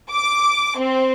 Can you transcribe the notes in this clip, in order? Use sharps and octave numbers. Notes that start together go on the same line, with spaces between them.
D6
C4